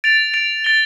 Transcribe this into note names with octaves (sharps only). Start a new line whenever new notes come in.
A6 D7 F7
A6 D7 F7
A6 D7 G7